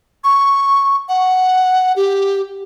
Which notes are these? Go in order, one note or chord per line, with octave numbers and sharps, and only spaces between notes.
C#6
F#5
G4